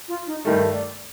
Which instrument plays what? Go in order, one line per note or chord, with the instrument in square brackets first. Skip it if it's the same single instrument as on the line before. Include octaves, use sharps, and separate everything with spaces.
[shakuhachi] F4
D#4
[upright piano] G2 D#3 A3 [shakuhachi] G4
[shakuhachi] D5